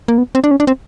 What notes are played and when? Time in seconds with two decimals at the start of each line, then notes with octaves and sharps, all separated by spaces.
0.08 A#3
0.18 B3
0.35 C4
0.44 D4
0.51 C#4
0.60 D4
0.67 C4